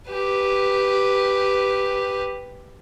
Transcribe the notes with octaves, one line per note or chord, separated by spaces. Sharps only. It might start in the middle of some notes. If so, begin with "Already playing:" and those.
G4 B4